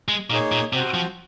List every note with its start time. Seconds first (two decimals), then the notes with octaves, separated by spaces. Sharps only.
0.08 G#3
0.30 A#2 A#3 D#4 G#4 C#5
0.52 A#2
0.73 C3 C4 F#4 C5 F#5
0.94 F3